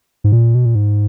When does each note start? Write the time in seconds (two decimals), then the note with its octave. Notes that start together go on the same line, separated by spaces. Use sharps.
0.24 G#2
0.32 A#2
0.55 B2
0.65 A#2
0.75 G#2